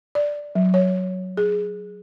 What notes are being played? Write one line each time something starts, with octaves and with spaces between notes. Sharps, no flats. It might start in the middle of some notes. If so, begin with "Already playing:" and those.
D5
F#3
C#5
G#4